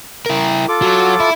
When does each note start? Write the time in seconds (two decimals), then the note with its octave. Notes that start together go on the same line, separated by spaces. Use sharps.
0.26 E4 A#4
0.68 F4 A4 D6
0.82 F#3 F#4
1.20 E4